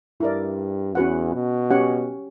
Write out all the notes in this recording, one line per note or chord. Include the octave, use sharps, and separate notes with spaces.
G2 E4 A#4 D5
E2 C#4 F#4 B4 F#5
B2
C#4 G4 C#5 F#5